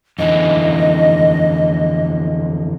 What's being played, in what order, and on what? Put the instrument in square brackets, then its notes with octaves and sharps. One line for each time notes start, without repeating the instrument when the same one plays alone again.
[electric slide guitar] F2 D3 E3 [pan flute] D#5